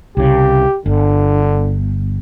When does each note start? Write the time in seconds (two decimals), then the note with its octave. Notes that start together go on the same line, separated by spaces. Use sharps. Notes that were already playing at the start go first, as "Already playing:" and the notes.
0.17 C2 C#3 G4
0.86 G1 D3